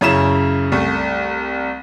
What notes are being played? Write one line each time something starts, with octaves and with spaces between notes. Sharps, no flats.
F#2 C#3 E4 E7
C2 A3